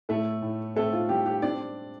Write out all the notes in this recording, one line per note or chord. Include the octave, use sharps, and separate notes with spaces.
A2 A3 A4
A2
A3 C4 A4
F4
G3 G4
G4
C4 D4 D5